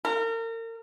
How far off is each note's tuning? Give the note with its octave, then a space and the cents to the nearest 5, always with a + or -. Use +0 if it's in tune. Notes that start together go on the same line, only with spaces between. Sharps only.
A#4 -35